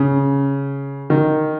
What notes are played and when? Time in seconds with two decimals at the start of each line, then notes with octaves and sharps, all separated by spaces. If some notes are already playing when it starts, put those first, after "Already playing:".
Already playing: C#3
1.10 D#3